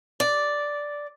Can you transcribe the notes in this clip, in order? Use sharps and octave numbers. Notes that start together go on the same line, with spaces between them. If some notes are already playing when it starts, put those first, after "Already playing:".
D5